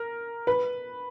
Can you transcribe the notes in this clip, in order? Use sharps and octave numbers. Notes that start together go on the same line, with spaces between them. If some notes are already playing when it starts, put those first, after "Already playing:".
Already playing: A#4
B4